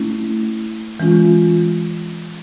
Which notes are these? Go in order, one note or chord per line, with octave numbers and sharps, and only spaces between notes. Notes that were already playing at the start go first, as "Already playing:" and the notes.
Already playing: A3 C#4 E4
E3 G#3 C#4 F4